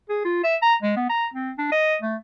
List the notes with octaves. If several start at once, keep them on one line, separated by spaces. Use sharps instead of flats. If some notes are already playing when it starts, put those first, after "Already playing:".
G#4
F4
E5
A#5
G#3
B3
A#5
C4
D4
D#5
A3